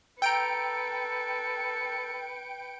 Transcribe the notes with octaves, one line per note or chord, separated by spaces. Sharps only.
A4 B4 G5 A#5 E6 C#7 D7